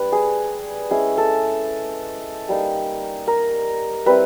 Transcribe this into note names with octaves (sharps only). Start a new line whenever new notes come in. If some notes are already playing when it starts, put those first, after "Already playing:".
Already playing: G3 D4 B4
G#4
G#3 C#4 E4 G#4
A4
G3 A#3 D#4
A#4
G3 C4 E4 B4